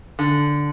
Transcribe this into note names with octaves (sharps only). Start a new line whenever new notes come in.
D3